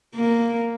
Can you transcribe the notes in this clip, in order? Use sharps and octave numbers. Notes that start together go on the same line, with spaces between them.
A#3